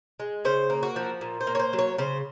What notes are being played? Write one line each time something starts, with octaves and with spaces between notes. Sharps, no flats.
G#3
C#3 C5
A#3
F#4
F3
A#2
C5
A#3
C#5
C5
F#3
C#5
C#3 C5